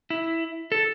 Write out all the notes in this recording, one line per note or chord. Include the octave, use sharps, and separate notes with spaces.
E4
A4